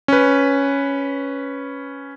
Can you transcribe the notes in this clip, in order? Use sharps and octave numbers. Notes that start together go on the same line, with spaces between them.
C#4 B4